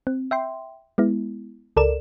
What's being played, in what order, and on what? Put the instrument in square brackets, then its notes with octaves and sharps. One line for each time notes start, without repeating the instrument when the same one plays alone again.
[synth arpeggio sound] C4
E5 G5 C6
G#3 B3 E4
C#2 A4 A#4 D5 E7